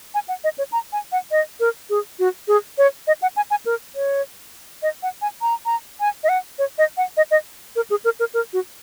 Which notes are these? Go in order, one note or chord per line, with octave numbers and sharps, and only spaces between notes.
G#5
F#5
D#5
C#5
A#5
G#5
F#5
D#5
A#4
G#4
F#4
G#4
C#5
D#5
F#5
G#5
G#5
A#4
C#5
D#5
F#5
G#5
A#5
A#5
G#5
D#5
F#5
C#5
D#5
F#5
D#5
D#5
A#4
G#4
A#4
A#4
A#4
F#4